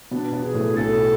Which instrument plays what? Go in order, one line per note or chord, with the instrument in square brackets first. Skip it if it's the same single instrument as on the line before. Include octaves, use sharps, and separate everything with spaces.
[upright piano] B2 B3 [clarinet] D4
[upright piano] B2 B3
[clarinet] G#4
[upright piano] A2 A3
[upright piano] B1 B2 [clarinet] A4